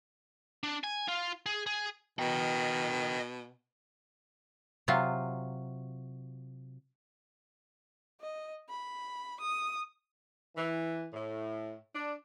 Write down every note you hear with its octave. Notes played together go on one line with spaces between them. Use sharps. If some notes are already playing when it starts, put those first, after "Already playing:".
D4
G#5
F4
G#4
G#4
B2 D#5 G5
C3 F#3 F4
D#5
B5
D#6
E3
A2
D4